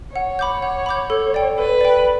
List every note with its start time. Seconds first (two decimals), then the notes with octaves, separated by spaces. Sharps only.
0.16 C#5 F#5
0.39 B5 D6 G6
0.62 F#5
0.86 B5 D6 G6
1.10 A4
1.34 D5 G5
1.58 A4 B4
1.81 D5 G5